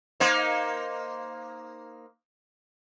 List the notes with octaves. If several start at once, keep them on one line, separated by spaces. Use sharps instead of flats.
A#3 D#4 C5